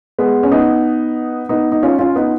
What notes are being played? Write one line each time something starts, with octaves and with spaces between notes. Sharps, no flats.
G#3 B3
C#4
B3 D#4
B3 D#4
D#4
C#4 F4
C#4 F4
B3 D#4